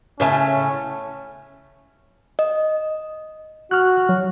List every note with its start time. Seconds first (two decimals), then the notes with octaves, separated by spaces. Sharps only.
0.20 A2 C#3 A3 C#4
2.39 D#5
3.71 F#4 F6 F#6
4.09 F#3